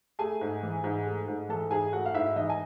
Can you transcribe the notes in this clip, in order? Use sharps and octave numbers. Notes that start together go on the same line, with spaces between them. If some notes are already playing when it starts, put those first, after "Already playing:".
A3 G#4 G#5
G#2
E3
G#2
A3
G#2
E3 A4 A5
G#2 G#4 G#5
A3 F#4 F#5
F5
G#2 E4 E5
E3 D#4 D#5
G#5